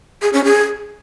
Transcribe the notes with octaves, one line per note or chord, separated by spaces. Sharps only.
G#4
C#4
G#4